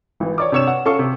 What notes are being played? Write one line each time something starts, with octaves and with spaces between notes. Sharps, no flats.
G#1 E3
C#5 D5 D6
C3 D4 C#5 E6 E7
F#5
C#4 A4 F5 C#6
C3